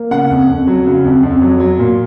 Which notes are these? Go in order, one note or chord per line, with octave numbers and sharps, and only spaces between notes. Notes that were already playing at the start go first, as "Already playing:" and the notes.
Already playing: A#3
C#3 F#5
F2
F2
F#3
C#3
F2
F2
F#3
F#3
A#2